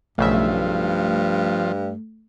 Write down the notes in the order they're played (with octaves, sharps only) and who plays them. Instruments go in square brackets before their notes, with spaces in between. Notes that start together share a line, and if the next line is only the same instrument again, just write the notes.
[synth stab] B1 C#3 E5 [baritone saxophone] G2 [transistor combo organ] F3 [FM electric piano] A3